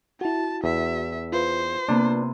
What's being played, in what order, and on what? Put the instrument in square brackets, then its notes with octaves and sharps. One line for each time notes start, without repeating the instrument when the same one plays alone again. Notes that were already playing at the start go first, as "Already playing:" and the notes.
[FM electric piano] E4 F#4 [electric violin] A5
[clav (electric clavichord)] E2 [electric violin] E5
[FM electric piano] F4 B4 [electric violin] C5
[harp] C3 A#3 B3 [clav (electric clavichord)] D4